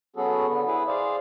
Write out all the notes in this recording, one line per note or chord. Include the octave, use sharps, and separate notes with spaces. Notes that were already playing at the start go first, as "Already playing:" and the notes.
F#3 B3 C#4 F#4 G#4 A4
D3 B3
E4 G#4 B4
G#4 C5 D5 F5